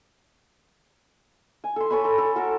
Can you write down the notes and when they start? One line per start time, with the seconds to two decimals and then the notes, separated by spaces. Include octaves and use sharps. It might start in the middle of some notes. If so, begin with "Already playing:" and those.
1.64 G#5
1.76 A4 C6
1.90 A4 C#5 G#5 B5
2.05 A4
2.18 A4
2.35 F#4 A4 A#4